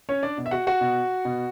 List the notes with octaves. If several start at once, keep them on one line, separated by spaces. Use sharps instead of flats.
C#4 C#5
D4 D5
B2
E5
F#4 F#5
F#4 F#5
B2
B2